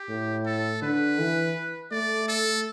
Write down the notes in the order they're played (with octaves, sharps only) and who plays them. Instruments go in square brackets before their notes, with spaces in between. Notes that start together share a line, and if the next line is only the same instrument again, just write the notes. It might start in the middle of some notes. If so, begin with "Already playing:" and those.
Already playing: [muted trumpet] G4
[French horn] A2
[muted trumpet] A4
[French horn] D3 [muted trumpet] B4
[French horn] E3
[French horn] A3 [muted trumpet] D5
[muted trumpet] A4